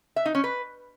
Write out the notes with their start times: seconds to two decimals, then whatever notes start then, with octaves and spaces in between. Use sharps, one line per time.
0.16 E5
0.26 D#4
0.35 C#4
0.44 B4